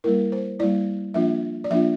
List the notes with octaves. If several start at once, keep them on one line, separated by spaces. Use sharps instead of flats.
G3 A#3 E4 A#4
C5
G3 A#3 E4 D5
F3 A#3 D4 F4 E5
D5
F3 A#3 D4 F4 E5